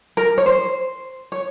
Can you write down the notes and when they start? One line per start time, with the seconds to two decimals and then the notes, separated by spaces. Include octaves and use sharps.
0.17 A#4
0.38 C#5
0.46 C5
1.32 C#5